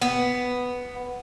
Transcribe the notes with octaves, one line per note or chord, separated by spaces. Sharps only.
B3